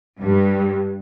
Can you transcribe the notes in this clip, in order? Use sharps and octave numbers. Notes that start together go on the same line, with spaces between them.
G2